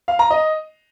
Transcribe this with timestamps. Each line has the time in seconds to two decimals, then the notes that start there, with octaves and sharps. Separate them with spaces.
0.08 F5
0.19 A#5
0.31 D#5